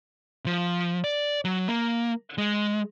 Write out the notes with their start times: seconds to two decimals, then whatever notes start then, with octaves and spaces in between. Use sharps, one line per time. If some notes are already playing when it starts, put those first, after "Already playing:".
0.46 F3
1.04 D5
1.45 F#3
1.68 A#3
2.38 G#3